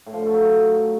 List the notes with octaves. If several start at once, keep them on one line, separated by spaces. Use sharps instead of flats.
A2
F3
D3
A3
F#3